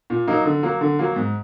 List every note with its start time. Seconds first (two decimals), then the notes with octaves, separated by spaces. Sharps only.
0.10 A#2
0.27 F#3 A#3 D#4
0.45 D3
0.63 F#3 A#3
0.81 D3
0.99 F#3 A#3
1.16 G#2